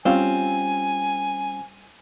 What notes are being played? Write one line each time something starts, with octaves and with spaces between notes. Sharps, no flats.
G3 C4 C#4 F4 G#5